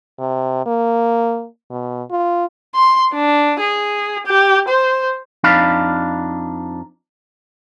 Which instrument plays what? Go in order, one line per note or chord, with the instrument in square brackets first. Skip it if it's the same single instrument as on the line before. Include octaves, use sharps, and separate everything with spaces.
[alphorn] C3
A#3
B2
F4
[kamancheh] C6
D4
G#4
G4
C5
[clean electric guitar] F2 D4 D#4 F5 B5